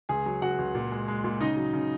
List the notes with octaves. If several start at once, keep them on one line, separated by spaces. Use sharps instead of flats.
C#2 G#4 G#5
F#3
C#2 F#4 F#5
C#2
A#2
G#3
G#3
A#2
C#3 D#4 D#5
F#3
C#3